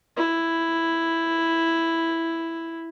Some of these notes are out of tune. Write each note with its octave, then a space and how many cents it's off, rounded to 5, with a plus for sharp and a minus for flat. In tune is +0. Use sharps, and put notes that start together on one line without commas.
E4 +0